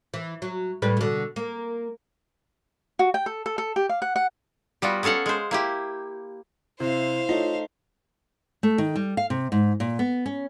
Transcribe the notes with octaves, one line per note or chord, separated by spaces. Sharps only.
E3
F#3
A2 G3 B4
B2 D3
A#3
F#4
G5
A4
A4
A4
G4
F5
F#5
F#5
G3 B3 F4 F#4
B3 C#4 A4 F5 F#5
G#3 C5
A#3 E4 G4
C3 E4 C5 F5
A3 D#4 F4 C#5
A3
D#3
G3
F5
C3
G#2
A#2
B3
C#4